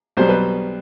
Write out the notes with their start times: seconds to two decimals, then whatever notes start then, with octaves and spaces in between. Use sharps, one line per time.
0.17 B1 B2 G3 C5
0.29 B4